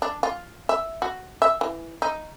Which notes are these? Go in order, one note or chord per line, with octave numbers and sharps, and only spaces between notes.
D4
F4
E5
F#4
E5
E3
D#4